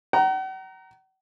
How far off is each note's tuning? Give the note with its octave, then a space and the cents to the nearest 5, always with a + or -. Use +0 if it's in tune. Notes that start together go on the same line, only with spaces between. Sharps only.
F#5 +45 A#5 +0